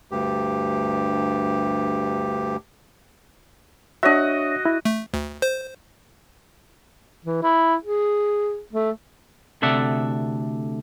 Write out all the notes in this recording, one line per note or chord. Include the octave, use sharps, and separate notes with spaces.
D2 G2 G4
D4 F#4 C#5 D#5 E5
E4
A3
D2
C5
E3
E4
G#4
A3
D2 C3 A4 D5 E5 F#5